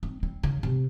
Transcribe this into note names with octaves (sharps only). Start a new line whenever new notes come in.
C4
C4
C#3
C3